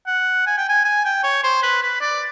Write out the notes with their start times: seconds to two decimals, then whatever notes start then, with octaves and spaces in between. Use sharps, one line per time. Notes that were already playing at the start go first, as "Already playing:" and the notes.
0.07 F#5
0.46 G#5
0.58 G5
0.69 G#5
0.85 G#5
1.05 G5
1.24 C#5
1.44 C5
1.63 B4
1.82 B4
2.01 D5